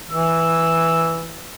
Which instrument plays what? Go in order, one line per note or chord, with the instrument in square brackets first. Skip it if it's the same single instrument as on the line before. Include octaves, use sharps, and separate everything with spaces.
[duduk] E3 [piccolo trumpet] E6